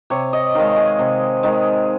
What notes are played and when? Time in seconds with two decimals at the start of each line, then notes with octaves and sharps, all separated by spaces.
0.10 C3 C#5
0.33 D#5
0.55 D#3 G#3 F5
0.77 G#5
0.99 C3
1.43 D#3 G#3